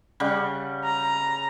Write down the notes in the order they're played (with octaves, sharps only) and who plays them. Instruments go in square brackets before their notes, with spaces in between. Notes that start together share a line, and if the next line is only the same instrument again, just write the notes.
[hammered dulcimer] C#3 G3 F#5
[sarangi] A#5